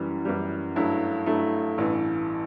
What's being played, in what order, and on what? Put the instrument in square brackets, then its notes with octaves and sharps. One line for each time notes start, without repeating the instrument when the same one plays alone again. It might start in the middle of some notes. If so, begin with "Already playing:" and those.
Already playing: [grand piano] F#2 E3 G3
F#2 E3 G3
G2 F#3 A3 E4
G2 F#3 A3 E4
A1 G2 E3